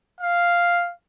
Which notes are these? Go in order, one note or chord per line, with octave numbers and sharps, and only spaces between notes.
F5